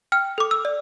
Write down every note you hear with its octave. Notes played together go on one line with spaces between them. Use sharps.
G5 F6
A4 D6
E6
D5